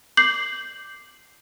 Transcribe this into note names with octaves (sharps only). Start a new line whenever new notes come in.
D6 G6 C7 F#7